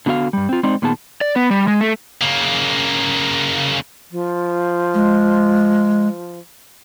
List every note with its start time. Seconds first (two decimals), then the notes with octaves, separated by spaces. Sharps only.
0.06 D3 B3 F#4 D#5 F5
0.33 G2 G3
0.49 C4 F4
0.63 G#3 C4 D#4 C5 D5 D#5
0.82 A#2 D#3 B3 G#4 A5
1.21 D5
1.36 B3
1.51 G3
1.68 G#3
1.81 A3
2.21 C#3 A#3
4.11 F3
4.94 G#3